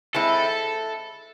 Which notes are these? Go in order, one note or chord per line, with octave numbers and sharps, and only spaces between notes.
G#3 C4 E4 A4